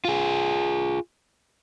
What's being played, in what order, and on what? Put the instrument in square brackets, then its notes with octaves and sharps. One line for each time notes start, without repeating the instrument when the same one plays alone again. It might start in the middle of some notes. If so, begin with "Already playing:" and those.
[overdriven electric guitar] F4 G#4